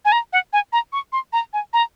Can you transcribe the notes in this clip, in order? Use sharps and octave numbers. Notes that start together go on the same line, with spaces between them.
G#5
A#5
F#5
G#5
A#5
C#6
C6
A#5
G#5
A#5